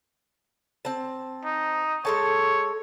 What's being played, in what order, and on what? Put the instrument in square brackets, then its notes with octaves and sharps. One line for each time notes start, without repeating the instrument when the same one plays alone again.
[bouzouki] C4 A5
[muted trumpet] D#4
[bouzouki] G#3 A4 A5 [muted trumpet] C#5